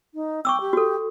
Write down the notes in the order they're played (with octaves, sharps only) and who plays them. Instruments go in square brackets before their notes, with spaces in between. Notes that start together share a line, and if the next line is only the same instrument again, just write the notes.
[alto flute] D#4
[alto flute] G5 [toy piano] C#6 D6 E6
[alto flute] G4
[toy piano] F#4 A4